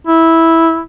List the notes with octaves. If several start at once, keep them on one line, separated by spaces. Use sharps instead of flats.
E4